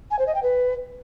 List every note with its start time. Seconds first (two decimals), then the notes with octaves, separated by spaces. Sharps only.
0.11 G#5
0.19 C5
0.27 D#5
0.34 G5
0.42 B4